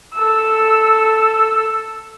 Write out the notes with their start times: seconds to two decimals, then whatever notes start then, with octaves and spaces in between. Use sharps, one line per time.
0.14 A4 E6